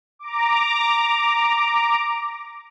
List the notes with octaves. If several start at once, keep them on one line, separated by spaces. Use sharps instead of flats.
A#5 D6